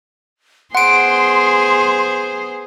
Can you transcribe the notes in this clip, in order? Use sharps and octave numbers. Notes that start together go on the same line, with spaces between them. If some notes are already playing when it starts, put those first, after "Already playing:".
B3 G#4 C5 F#5 C6 D7